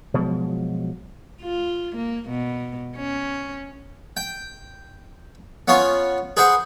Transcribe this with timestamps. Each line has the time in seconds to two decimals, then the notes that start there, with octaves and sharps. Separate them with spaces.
0.14 B2 F3 F#3 G#3
1.43 F4
1.96 A#3
2.29 B2
2.96 C#4
4.17 G5
5.68 B3 C#4 F4 C#5
6.37 G#4 B4 C5 F#5